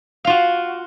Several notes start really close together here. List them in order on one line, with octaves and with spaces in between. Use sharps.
F5 F4 F#4